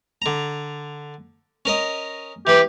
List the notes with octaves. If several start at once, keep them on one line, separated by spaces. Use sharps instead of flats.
D3 A#5
C#4 A#4 D#5
E3 G4 B4